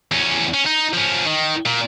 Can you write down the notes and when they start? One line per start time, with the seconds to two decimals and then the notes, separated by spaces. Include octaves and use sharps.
0.11 E2 C#4
0.54 C#4
0.66 D#4
0.94 F3 C#4
1.26 D#3
1.66 A#2